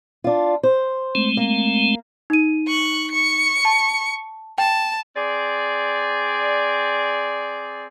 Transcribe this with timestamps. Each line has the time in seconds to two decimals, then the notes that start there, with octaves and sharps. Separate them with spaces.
0.24 D4 F4
0.63 C5
1.15 G#3 A3 C4
1.37 A#3
2.30 D#4 D#7
2.68 C#6 F#6
3.11 C#6 C#7
3.65 A5
4.58 G5 A5
5.17 C4 G#4 D5